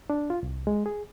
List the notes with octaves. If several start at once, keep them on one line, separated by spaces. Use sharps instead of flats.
D4
F4
C2
G#3
G#4